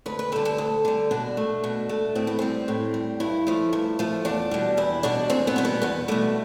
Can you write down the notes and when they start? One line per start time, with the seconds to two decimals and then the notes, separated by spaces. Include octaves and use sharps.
0.06 D2 B4
0.19 B4
0.32 D3 G3 A4
0.45 A4
0.58 D2
0.85 D3 G3
1.11 B2 D4
1.37 A3
1.64 B2
1.89 A3
2.15 A2 C4
2.27 B3
2.39 G3 C4
2.68 A2
2.94 G3
3.20 G2 E4
3.47 F3 A3
3.73 G2
3.99 F3 A3
4.25 E2 D4
4.51 B2 G3
4.77 E2 E4
5.03 B2 G3 D4
5.30 E2 C4
5.47 B3
5.56 B2 G3
5.65 B3
5.82 E2 B3
6.08 B2 G3 A3